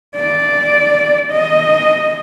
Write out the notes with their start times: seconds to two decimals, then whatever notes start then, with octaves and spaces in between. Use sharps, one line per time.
0.16 D5
1.32 D#5